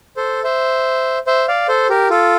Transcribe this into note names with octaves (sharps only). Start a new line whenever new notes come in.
A4 C5
C5 E5
C5 E5
D5 F5
A4 C5
G4 A#4
F4 A4